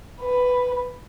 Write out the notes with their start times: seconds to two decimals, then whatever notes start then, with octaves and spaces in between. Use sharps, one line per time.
0.21 B4